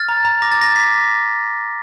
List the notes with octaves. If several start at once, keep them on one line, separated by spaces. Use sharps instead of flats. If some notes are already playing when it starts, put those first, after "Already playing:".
Already playing: F6 A6
A#5
A#5
D6 A#6
A6
D6 A#6
D6 B6